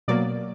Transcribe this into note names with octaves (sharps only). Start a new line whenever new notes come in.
B2 F#3 A#3 D5